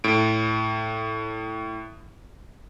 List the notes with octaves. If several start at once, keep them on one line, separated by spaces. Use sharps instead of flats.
A2 D7